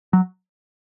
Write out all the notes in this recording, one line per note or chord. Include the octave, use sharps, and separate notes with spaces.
F#3